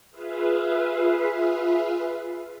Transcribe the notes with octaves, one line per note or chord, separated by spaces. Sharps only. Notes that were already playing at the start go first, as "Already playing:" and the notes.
F4 G#4 B4 E5 F5